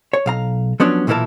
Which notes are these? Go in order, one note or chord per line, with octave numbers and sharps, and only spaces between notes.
C#5
B1 F5 A#5
F3 F#3 B3 C#4 D4
B1 A#2 E3 E4 A#4 A5